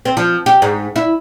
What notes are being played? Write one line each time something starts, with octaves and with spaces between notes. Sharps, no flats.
C4
F3
G4
G#2
E4